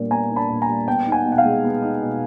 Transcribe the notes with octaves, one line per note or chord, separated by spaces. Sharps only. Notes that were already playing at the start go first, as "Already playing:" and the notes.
Already playing: A#2 G3 B3 D4
B3 G#5 A#5
D4
A5 B5
A#2
G#5 A#5
G3
B3 G5 A5
D#4
F#5 G#5
B2
F#5
F5 G5
G#3
B3
D#4
B2